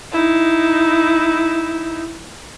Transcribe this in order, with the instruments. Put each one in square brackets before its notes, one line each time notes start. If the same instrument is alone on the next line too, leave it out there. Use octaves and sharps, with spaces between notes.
[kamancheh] D#4 E4